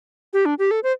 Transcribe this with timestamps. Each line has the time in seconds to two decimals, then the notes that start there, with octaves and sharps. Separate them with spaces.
0.33 G4
0.46 D4
0.59 G4
0.71 A4
0.83 C5